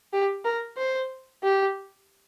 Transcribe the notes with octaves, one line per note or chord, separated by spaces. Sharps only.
G4
A#4
C5
G4